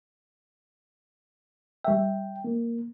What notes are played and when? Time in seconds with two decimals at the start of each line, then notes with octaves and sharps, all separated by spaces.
1.84 G3 E5 G5
2.44 A#3